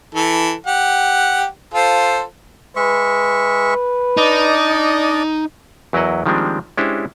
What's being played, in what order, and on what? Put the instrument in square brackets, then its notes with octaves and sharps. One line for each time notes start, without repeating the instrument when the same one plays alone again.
[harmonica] E3 A4
G4 F#5
F4 A4 C5
[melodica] G#3 E5 C#6 [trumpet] B4
[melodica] D4 D5 D#5 [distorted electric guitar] D#4
[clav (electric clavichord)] E2 F#3 E4 A#4 D#5 F#5
D#3 F3 G3 G#3 C4 D4
G#3 C#4 D4 E4 G4 C5